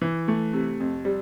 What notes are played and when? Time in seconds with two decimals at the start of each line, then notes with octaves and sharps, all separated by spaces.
0.02 E3
0.28 A3
0.53 C3
0.80 F2
1.05 G3